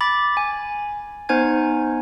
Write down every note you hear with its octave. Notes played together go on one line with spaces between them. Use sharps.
B5 D6 A6
G#5
B3 D#4 C5 G#5 G#6